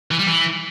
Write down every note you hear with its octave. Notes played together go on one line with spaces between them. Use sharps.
E3
G3
E3